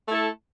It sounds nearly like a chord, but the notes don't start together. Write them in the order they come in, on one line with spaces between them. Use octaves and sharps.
A3 E4 A4